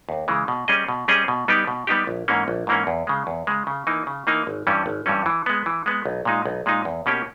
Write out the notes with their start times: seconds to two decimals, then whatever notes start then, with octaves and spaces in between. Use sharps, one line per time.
0.09 D#2
0.28 C#3 E3 G#3
0.48 B2
0.68 G3 C#4 G#4 D#5
0.88 B2
1.08 G3 C#4 G#4 D#5
1.28 B2
1.48 G3 B3 D#4 G4
1.67 B2
1.87 G3 B3 D#4 G4
2.07 A#1
2.28 G#2 E3 A#3 C#4
2.48 A#1
2.67 G#2 E3 A#3 C#4
2.87 E2
3.07 C#3 G#3
3.27 E2
3.47 C#3 G#3
3.67 C#3
3.87 E3 A#3 D#4
4.07 C#3
4.27 E3 A#3 D#4
4.47 G#1
4.67 G2 E3 G3 C#4
4.86 G#1
5.06 G2 E3 G3 C#4
5.26 E3
5.46 G#3 B3
5.66 E3
5.86 G#3 B3
6.06 B1
6.25 A#2 G#3 D#4
6.45 B1
6.66 A#2 G#3 D#4
6.85 E2
7.06 B2 A#3 C#4 G4